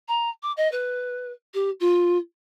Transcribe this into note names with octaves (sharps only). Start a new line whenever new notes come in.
A#5
D6
D#5
B4
G4
F4